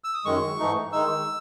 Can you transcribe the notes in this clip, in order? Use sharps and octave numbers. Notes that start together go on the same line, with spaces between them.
E6
D#6
F#2 D#3 G#3 C#6
G#2 E3 A3 D#4
D#3 G#3 D#4 E6